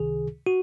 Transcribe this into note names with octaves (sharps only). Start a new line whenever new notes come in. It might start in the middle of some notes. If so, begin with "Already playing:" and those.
Already playing: C#2 C3 D#3 G#4
F#4